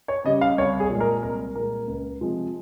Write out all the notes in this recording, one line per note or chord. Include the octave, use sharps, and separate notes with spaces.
C#5
C#3 G3 D#5
F5
C2 C#5
G#4
A#2 G#3
A#4
C2 A#4
A#2 G#3 A#4
C#2
C3 F3 G#3